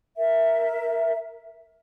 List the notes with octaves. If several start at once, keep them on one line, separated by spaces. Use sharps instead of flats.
A#4 E5